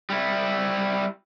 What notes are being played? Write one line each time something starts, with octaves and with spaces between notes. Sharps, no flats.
G3 E4